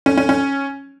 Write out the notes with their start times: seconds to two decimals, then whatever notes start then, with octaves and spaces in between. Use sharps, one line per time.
0.06 C#4
0.17 C#4
0.29 C#4